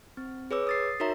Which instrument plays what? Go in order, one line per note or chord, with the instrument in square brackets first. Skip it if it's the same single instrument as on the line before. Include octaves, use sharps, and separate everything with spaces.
[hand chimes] C4
G#4 B4 C#5 D6 E6
D#6 A6 C7
D#4 F#4 A#4 C#5 E5 A#5